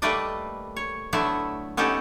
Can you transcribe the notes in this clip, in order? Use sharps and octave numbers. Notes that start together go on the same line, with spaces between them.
G3 A3 A#3 B4 D5 D#5
C#5
D3 F#3 A3 B3 E4 E5
B3 C#4 D#4 G4 A4